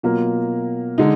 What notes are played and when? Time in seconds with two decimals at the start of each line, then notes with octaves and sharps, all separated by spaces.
0.03 B2 F#3 A#3 F4 A#4
0.98 D3 G#3 D#4